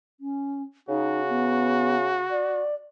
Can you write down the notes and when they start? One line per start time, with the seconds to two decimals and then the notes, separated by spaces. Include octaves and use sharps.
0.20 C#4
0.89 C#3 D#4 F#4
1.29 B3
2.31 D5